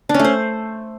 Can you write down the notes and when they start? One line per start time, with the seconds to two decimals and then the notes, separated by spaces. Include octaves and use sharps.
0.09 D4
0.14 C#4
0.19 A3
0.24 C5